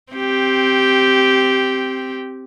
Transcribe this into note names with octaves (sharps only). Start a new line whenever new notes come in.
C4 G4